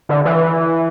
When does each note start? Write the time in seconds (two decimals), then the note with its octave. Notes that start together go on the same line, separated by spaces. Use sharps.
0.09 D3
0.25 E3